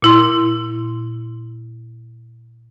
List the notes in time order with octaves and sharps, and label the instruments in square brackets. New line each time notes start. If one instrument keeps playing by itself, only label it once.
[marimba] A#2 E4 C6